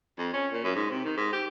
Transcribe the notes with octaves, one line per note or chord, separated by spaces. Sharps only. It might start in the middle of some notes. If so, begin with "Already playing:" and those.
F2
C#4
A#2
F#2
G#2
C3
D#3
G#2
G4